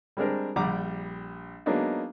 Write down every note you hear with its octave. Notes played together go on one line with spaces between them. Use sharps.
G3 G#3 C4 D4 A#4
A#1 G3 G4 F#5 A#5 D6
F#3 G#3 A#3 B3 D4 D#4